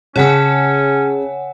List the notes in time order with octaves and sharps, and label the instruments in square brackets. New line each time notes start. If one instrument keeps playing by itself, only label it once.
[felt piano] C#3 [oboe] C#4 [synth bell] C#5 F#5 G#5 [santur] A5 E6